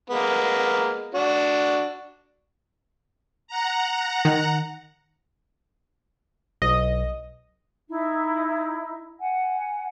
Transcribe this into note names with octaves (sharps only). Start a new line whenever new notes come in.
G#3 A#3 B3
D4 F#4
F#5 A#5
D#3
B1 D#5
D#4 E4
F#5 G#5